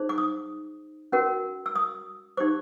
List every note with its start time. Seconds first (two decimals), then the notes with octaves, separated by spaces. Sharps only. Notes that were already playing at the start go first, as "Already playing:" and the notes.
Already playing: D#4 G#4 C5
0.09 D6
0.18 D#6
1.12 C#4 F#4 A#4
1.66 E6
1.76 D#6
2.37 D#4 G4 C5 D6